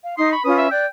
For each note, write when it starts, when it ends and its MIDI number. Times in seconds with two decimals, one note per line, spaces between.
0.05 0.17 77
0.18 0.31 63
0.18 0.28 84
0.18 0.31 87
0.32 0.42 83
0.32 0.41 85
0.45 0.67 61
0.45 0.67 65
0.45 0.67 71
0.45 0.56 87
0.58 0.70 76
0.71 0.85 74
0.71 0.87 79
0.71 0.85 90